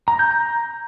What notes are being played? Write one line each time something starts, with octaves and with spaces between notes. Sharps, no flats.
A#5
G6
A#5